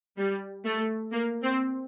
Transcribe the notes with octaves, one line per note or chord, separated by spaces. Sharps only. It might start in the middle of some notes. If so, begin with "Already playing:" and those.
G3
A3
A#3
C4